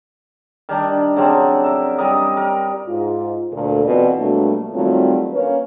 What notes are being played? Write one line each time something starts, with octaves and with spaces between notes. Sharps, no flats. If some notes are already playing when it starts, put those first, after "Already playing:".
D#3 G3 D4
C#3 F#3 C4 D4
A#4 E5
G3 E4 A#4 D#5
A#4
G#2 F4
D2 A#2 A4
E2 B2 E3 C4 F4 D5
B2 F#3 G3 A3 A#3 D4
D#3 F#3 G3 A3 C4 F4
A#3 C#4 B4